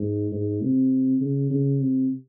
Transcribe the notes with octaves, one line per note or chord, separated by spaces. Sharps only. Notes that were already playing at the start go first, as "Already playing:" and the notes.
Already playing: G#2
G#2
C3
C#3
C#3
C3